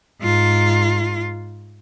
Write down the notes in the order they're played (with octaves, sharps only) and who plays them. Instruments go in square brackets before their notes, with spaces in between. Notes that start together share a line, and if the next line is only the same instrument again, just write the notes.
[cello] G#2 F4